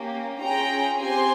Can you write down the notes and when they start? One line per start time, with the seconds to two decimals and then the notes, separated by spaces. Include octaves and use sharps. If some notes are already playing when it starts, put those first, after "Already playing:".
Already playing: A#3 C#4 G4
0.41 C#4 F4 G#4 G5 A#5
1.01 C4 G4 G#5 C6